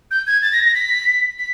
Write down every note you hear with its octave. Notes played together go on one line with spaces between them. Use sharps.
G6
G#6
A6
A#6
A#6
B6
B6